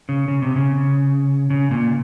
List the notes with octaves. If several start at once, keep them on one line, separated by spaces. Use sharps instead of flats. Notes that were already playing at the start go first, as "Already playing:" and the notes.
C#3
C#3
C3
C#3
C#3
A#2